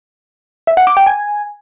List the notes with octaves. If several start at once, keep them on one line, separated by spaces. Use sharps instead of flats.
E5
F#5
D6
G5
G#5